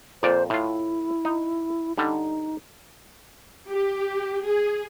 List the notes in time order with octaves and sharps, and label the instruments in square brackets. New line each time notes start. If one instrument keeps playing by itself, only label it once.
[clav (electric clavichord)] F2 A#2 D5 [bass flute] C5
[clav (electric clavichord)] A2 F4 [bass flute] E4
[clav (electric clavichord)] D#4
[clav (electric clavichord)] D3 G3 [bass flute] D#4
[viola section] G4
G#4